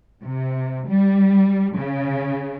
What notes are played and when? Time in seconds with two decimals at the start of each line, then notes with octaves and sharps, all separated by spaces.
0.23 C3
0.88 G3
1.77 C#3